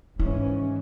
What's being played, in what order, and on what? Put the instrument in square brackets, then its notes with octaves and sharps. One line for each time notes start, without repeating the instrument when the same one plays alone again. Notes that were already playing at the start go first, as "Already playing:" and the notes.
[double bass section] G#2 E3 C#4 [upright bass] E4